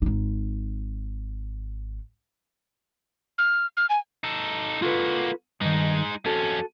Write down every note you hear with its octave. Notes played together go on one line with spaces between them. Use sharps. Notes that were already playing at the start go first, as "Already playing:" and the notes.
G#1 D#4
F6
F6
G#5
D#4 A4
A#3 F4 F#4 A4 B4
G2 D#3 G#3 D#4
F2 C#4 F#4 A4